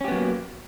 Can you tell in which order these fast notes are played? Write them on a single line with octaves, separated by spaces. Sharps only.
C#4 G4 B3 F#3 A#3